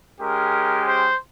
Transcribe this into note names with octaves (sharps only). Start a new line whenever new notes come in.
G#3 C#4 G4 A#4
C5